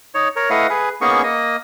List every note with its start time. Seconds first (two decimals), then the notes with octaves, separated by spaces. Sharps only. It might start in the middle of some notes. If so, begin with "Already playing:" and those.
0.15 D#4 C#5
0.36 A#4 C#5
0.50 A3 E4 B4 D#5 F5 F#5
0.69 G#4 B4
1.01 A#3 B3 C#4 D#4 G#4 C#6
1.23 A#3 D#5